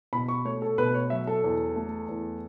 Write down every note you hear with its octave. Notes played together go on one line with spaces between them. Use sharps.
B2 B5
C#6
A3 C#5
A4
B2 B4
C#5
F#3 E5
A4
E2
A3
E2